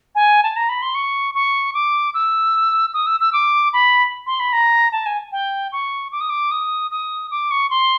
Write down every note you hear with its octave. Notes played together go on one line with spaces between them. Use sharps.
G#5
A5
A#5
B5
C6
C#6
C#6
D6
E6
D#6
E6
E6
D6
B5
C6
B5
A#5
A5
G#5
G5
C#6
D6
D#6
D6
D#6
D#6
D6
C#6
C6